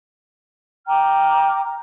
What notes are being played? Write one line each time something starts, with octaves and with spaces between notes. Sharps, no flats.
G5 A#5 D6 F6